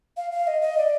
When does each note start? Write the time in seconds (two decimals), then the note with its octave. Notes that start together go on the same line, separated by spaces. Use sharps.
0.17 F5
0.32 F5
0.47 D#5
0.62 D#5
0.78 D5